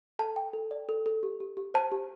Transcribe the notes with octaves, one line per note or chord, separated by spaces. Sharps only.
A4 A5
G5
A4
D5
A4
A4
G4
G4
G4
C5 A5
G4